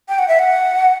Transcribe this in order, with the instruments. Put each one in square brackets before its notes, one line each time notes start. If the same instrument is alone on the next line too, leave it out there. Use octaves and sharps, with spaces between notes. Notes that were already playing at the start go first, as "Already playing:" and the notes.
[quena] G5
F#5
E5
F#5